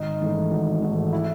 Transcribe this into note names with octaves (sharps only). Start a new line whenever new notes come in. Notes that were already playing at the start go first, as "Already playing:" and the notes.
Already playing: G#1 D#4
G#2 E3 A3
G#1
G#2 E3 A3
E4